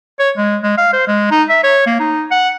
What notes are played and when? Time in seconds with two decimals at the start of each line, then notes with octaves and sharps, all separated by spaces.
0.19 C#5
0.37 G#3
0.63 G#3
0.78 F5
0.93 C5
1.07 G#3
1.31 D#4
1.49 E5
1.64 C#5
1.86 A#3
2.00 D#4
2.31 F#5